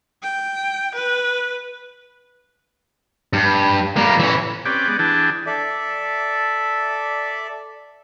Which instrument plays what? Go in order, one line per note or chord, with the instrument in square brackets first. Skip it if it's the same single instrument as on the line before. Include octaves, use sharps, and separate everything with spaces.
[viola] G5
B4
[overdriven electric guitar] G2
G3 A#3
E3 C#4
[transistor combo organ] C4 C#4 G4 B4 D5 G5
G#3 B3 D5
E3 D4 G#4 G5 A5
[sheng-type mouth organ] A4 D5 E5